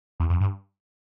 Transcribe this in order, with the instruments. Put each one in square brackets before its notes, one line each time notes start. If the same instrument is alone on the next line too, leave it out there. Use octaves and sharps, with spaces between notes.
[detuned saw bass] E2
F2
G2